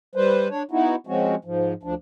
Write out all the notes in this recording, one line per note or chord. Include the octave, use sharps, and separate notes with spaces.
G3 B4 C5
D4 C#5
B3 D#4 E4 F#4
F3 G#3 C4 C#4 F#4
G#2 F3
D2 F3 D4